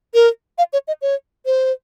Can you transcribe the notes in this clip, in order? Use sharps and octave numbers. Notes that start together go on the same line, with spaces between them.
A#4
F5
C#5
D#5
C#5
C5